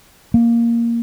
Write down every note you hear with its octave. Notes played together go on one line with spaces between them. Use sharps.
A#3